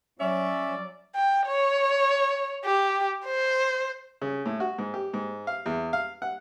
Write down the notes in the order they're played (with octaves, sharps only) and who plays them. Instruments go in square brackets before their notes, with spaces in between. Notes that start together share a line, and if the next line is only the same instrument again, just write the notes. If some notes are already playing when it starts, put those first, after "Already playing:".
[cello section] F#3 [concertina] C#4 [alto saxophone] D5 [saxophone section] E5
[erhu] G5
C#5
G4
C5
[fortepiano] C#3
A2
F#4
G#2
G4
G#2
F5
E2
F5
F#5